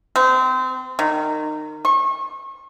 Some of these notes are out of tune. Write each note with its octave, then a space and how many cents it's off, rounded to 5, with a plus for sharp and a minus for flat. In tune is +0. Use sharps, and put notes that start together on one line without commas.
C4 -30
D#3 -25
C#6 -35